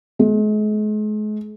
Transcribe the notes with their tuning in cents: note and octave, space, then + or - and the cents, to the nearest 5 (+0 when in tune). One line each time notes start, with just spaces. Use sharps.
G#3 +40